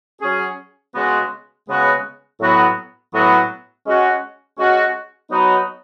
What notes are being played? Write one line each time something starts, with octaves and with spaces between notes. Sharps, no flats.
F#3 C#4 G#4
C#3 G#3 B3 F#4
C#3 G#3 B3 F#4
A2 F#3 B3 F#4
A2 F#3 B3 F#4
G#3 C#4 F#4
G#3 C#4 F#4
F#3 B3 D#4 F#4